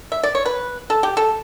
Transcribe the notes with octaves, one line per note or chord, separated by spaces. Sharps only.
E5
D5
C#5
B4
A4
G4
A4